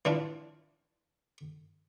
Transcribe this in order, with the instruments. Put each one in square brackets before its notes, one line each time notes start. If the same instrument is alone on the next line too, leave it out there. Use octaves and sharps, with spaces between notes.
[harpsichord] E3 D4 F4